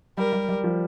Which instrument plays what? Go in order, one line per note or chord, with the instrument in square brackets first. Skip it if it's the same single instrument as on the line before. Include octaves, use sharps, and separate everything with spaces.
[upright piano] G3 [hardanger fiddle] A#4
[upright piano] G3
G3
F3